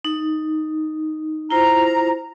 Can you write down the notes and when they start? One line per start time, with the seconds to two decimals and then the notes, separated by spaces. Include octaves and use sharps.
0.05 D#4
1.51 E4 F4 C5 A#5